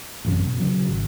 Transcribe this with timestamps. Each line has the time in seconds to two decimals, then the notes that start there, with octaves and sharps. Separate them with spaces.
0.25 A1 F#2 C3 C#4
0.46 B2
0.59 C#3 F#3
0.87 G#1